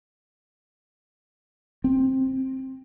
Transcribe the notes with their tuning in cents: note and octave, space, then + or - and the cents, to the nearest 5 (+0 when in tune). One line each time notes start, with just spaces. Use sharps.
C4 +10